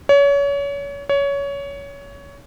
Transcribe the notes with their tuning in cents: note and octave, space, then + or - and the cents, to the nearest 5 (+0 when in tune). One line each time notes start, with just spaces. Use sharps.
C#5 +30
C#5 +20